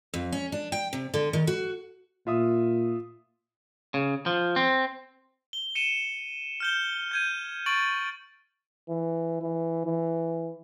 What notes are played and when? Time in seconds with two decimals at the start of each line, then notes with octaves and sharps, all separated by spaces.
0.14 F2
0.32 C#4
0.52 D4
0.72 G5
0.93 C3
1.14 D3
1.33 D#3
1.47 F#4
2.27 A#2 F4 E5 D#6
3.94 C#3
4.26 F3
4.56 C4
5.53 G7
5.75 C#7 D#7 E7
6.60 F6 G6 G7
7.11 G6 G#6 D#7
7.66 C#6 A6 D7 F#7
8.89 E3
9.42 E3
9.85 E3